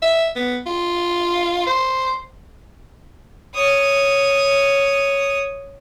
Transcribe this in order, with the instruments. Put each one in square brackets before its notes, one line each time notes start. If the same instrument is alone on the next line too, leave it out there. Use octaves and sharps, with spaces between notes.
[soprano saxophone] E5
B3
F4
C5
[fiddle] C#5 D#6